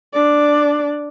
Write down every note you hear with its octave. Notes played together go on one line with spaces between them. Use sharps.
D4 D5